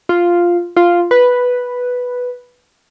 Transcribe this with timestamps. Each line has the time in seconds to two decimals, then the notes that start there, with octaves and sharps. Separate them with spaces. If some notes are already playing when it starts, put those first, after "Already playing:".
0.09 F4
0.77 F4
1.11 B4